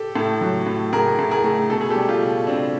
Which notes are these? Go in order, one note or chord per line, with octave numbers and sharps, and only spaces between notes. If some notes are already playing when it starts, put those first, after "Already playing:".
Already playing: G4 A4
A2
F#3
A2
A2 G#4 A#4
A2
G#4 A#4
A3
B2 A4
G#4
G3 G4 A4
F4 G4
B2
B2 C4 D4